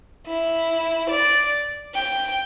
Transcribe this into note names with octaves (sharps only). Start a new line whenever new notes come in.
E4
D5
G5